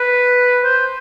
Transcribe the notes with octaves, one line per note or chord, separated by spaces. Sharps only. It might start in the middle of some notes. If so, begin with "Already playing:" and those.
Already playing: B4
C5